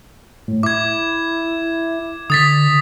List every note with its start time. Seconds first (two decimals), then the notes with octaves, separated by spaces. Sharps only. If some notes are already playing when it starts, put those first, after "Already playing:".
0.48 A2
0.63 E4 D6 G#6
2.30 D3 D#6 A6 B6